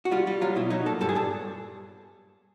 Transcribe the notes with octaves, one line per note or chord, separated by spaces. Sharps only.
F#4
G3 F4
G3
F#3 F4
B2 E4
F#3 D#4
A#2 A4
G2 A4
G#4
G2 A4